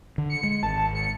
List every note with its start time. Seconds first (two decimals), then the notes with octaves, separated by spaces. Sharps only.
0.18 D3
0.30 C#7
0.44 G#3
0.63 G#1 A5
0.95 C#7